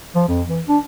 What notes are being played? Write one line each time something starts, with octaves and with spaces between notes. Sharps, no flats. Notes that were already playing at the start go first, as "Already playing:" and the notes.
F3
F2
E3
D4